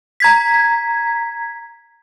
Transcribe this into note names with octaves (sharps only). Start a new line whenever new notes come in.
A#5 G#6 B6